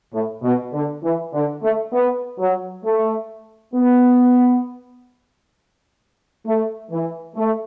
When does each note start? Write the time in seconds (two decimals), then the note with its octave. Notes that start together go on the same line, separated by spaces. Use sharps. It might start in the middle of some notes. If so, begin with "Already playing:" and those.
0.13 A2
0.43 B2
0.73 D3
1.03 E3
1.33 D3
1.63 A3
1.93 B3
2.39 F#3
2.84 A3
3.74 B3
6.46 A3
6.91 E3
7.36 A3